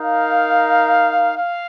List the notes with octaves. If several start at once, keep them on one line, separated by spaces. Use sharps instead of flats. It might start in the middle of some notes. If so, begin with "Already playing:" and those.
Already playing: D#4 A#4 F5
F5